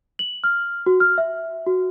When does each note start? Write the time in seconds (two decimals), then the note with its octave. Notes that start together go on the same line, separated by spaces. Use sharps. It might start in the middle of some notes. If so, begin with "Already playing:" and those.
0.19 F#7
0.44 F6
0.86 F#4
1.00 F6
1.18 E5
1.66 F#4